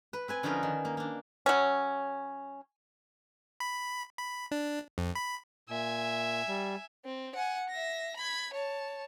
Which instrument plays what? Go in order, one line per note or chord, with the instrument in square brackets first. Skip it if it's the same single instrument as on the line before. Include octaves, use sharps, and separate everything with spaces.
[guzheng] B4
C4 B4 G#5
D3 F3 C#4 D#4 A#4 B4
D#3
A#3
A#3 D4
[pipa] F#3 C#4
[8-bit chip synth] B5
B5
D4
F2
B5
[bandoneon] A#2 [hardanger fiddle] E5 G#5
[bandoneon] G3
[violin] C4
F#5 G#5
E5 A#6
B5 G#6
C#5 A5